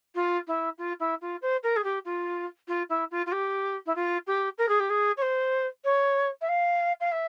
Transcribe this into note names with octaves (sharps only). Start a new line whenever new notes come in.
F4
E4
F4
E4
F4
C5
A#4
G#4
G4
F4
F4
E4
F4
F4
G4
E4
F4
G4
A#4
G#4
G4
G#4
C#5
C5
C#5
E5
F5
F5
E5